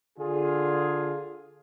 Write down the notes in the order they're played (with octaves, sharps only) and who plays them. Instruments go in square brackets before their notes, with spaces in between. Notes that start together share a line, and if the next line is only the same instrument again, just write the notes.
[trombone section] D3 F4 G#4